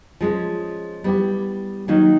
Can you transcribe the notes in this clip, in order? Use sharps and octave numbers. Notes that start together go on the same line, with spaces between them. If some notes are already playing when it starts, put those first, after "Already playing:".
F3 G#3 C#4
G3 B3 E4 G4
D#3 F#3 A#3 D#4